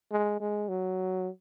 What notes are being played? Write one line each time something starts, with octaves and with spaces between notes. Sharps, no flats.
G#3
G#3
F#3